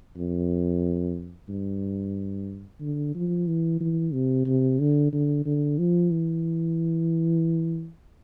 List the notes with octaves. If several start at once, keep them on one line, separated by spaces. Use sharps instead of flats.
F2
G2
D3
F3
E3
E3
C3
C3
D3
D3
D3
F3
E3